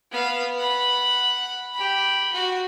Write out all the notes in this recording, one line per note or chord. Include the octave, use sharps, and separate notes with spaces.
B3 F5
F#5 B5
G4 B5
F#4